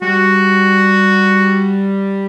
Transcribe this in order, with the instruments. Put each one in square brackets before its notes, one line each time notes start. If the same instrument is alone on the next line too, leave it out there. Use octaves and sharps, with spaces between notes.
[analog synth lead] G3 [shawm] F#4